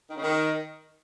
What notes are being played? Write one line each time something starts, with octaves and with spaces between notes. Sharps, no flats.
D#3
C#3
D#3